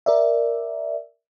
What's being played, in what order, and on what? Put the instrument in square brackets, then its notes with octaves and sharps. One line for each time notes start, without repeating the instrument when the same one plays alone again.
[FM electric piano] A#4 D5 E5